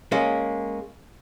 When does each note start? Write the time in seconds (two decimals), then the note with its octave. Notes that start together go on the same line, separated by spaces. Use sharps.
0.12 G#3 A#3 C#4